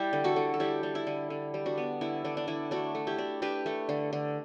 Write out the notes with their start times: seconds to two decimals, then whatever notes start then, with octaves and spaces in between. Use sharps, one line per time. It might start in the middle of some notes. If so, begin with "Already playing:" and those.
Already playing: G3 E4 G4
0.13 D3
0.24 F#4 A4
0.36 D3
0.54 A4
0.60 G3 E4 G4
0.83 G3
0.95 E4
1.07 D3
1.30 D3
1.54 G3
1.66 D4 F#4
1.78 B3
2.01 D3 E4
2.25 D3 D4
2.37 D4
2.48 D3 E4
2.71 A3 D4 F#4
2.95 A3
3.07 E4 G4
3.18 D4
3.42 D4 G4 B4
3.66 A3
3.89 D3
4.13 D3